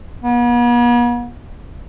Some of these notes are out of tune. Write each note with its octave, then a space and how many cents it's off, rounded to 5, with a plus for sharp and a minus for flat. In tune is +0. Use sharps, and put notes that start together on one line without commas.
B3 -45